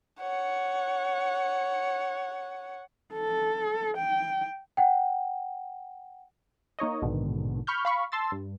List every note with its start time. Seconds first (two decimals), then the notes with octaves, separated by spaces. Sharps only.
0.21 C#5 F#5
3.13 A4
3.97 G5
4.77 F#5 G5
6.79 A#3 D#4 C#5 D#5
7.02 A#1 G#2 B2 D3 D#3
7.67 B5 C#6 F6 G6
7.85 F5 B5 C#6
8.12 A5 C6 E6 A6
8.32 G2